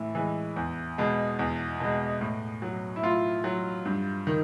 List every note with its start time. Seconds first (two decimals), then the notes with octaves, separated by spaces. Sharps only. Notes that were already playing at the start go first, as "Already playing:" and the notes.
Already playing: A2 E3 E4
0.15 E3 G#3
0.56 E2
0.98 B2 G#3
1.39 E2
1.80 B2 G#3
2.21 A2
2.62 F#3
2.96 E4
3.03 A2 F4
3.44 F#3
3.85 G2
4.27 D#3